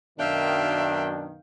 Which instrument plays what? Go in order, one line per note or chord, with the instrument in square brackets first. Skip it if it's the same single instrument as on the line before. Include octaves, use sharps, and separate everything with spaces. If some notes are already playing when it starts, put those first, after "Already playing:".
[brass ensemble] F#2 B2 D#3 [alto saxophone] D4 [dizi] E5 [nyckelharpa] F5 G5